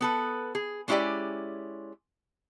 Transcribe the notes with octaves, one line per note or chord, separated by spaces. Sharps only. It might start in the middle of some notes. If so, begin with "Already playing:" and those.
B3 A4 B4
G#4
G#3 C#4 E4 G4 D5 G#5